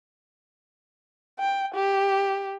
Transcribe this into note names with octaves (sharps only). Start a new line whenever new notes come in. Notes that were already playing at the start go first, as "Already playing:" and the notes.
G5
G4